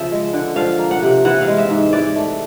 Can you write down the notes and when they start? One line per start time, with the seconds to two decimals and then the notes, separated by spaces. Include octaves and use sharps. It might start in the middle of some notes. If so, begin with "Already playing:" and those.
Already playing: C#3 F3 E5
0.12 G#3
0.33 D3
0.56 F3 F5
0.79 A#3
0.91 F#5
1.03 C3
1.25 E3 F#5
1.42 F5
1.47 G#3
1.58 E5
1.70 G#2
1.93 E3 D5
2.16 A3